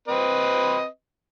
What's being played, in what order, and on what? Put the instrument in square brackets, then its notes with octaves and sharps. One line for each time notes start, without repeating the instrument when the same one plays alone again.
[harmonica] C4 B4 D#5